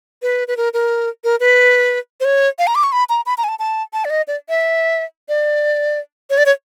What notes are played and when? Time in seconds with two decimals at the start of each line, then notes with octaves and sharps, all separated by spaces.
0.22 B4
0.48 B4
0.57 A#4
0.74 A#4
1.24 A#4
1.40 B4
2.20 C5
2.25 C#5
2.59 F5
2.67 A#5
2.75 D6
2.83 C#6
2.92 B5
3.09 A#5
3.26 B5
3.38 A#5
3.44 G#5
3.48 A5
3.59 A5
3.93 A5
4.05 D5
4.10 D#5
4.28 D5
4.49 E5
5.29 D5
6.30 C#5
6.38 D5
6.46 C#5